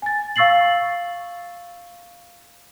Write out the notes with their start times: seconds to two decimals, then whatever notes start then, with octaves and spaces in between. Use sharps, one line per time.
0.02 G#5 A6
0.36 F5 C#6 E6 A6 C7 F#7